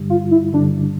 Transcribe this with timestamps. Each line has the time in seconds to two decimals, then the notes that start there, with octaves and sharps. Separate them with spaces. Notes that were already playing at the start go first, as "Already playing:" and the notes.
Already playing: G2 D3 G3
0.10 F4
0.31 E4
0.53 G2 D3 G3 D4